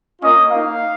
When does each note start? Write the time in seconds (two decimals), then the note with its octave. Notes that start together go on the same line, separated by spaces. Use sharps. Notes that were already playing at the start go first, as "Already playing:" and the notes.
0.21 A#3 C#4 F4 D#5
0.49 A#3 D#4 F5